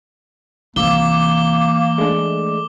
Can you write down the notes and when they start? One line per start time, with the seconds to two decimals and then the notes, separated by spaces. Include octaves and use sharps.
0.76 C2 C3 E3 A#3 D6 E6 G7
1.98 G#3 A3 D4